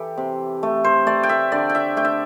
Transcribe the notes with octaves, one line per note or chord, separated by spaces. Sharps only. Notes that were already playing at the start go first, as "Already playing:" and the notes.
Already playing: E3 G4 A4
C3
A3
C5
A3 D5
G5
E5
D3 D5
G5
E5
A3 G5
E5